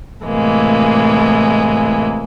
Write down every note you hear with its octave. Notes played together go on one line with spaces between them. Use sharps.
A2 C3 E3 G#3 A#3